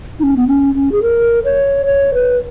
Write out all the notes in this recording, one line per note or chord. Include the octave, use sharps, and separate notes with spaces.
D#4
C#4
B3
C#4
C#4
G#4
A#4
C#5
C#5
B4